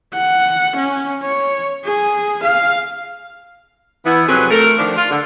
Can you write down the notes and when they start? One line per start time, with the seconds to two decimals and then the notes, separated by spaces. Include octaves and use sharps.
0.14 F#5
0.77 C#4
1.23 C#5
1.85 G#4
2.44 F5
4.06 E3 B3 E4
4.28 F2 C3 F#3 C4 G#4 B4
4.51 A3 A#4
4.77 D#3 F3 D4
4.96 F4
5.11 D3